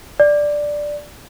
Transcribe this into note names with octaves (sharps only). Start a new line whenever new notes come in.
D5